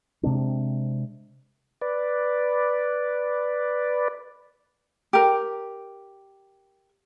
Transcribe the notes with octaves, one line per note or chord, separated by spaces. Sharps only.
C3 G#3 C4 D4
B4 D5
G4 A#4